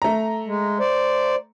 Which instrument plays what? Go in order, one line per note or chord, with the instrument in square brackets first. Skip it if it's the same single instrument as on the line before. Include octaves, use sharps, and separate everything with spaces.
[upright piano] A3 A#5
[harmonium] G#3
C5 D5